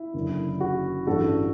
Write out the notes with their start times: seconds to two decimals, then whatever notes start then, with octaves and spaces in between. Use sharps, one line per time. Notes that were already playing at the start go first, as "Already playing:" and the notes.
Already playing: E4
0.14 F#1 F#2 D3
0.60 F#4
1.07 A1 G2 E3 F#4 A4